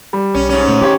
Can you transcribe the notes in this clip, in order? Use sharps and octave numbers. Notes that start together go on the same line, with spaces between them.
G3
B1 C#4
G#2 C#4
A#2 A3
E3 G4 C#5